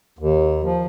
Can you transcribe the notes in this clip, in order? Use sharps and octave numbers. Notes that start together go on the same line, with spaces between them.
D#2
F3